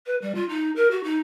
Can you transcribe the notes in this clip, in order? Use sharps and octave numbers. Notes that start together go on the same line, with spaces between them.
B4
G3
F4
D#4
A#4
F#4
D#4